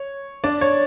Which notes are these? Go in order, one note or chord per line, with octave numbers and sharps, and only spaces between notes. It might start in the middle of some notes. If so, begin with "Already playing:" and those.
Already playing: C#5
D4 D5
C#5